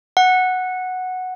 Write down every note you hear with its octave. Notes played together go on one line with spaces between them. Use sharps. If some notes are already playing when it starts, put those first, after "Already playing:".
F#5